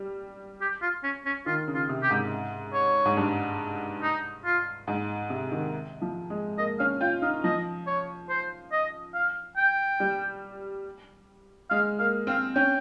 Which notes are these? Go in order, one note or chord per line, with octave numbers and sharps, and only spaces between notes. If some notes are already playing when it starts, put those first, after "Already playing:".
Already playing: G3
G4
F4
C#4
C#4
D#3 F4
C#3
F4
C3
G4
G#2
C#5
G#2
G2
D#4
F4
G#2
C3
D#3
F3
G#3
A#3 D#5
C#4 F5
F4 G5
D#4 F5
F3 D#5
C#5
C5
D#5
F5
G5
G3
G#3 F5
A#3 F5
C4 F5
C#4 G5